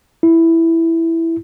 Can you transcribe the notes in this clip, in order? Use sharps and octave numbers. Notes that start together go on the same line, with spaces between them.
E4